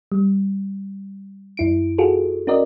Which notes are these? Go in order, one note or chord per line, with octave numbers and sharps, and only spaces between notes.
G3
F#2 E4 D7
F4 F#4 G#4 A4
C#4 F#4 A#4 D5 D#5